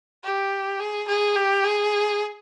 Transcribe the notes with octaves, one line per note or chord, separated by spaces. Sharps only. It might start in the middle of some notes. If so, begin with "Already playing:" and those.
G4
G#4
G#4
G4
G#4